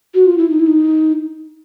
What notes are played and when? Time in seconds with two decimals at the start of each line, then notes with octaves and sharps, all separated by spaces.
0.15 F#4
0.26 F4
0.38 E4
0.50 D#4
0.60 E4
0.67 D#4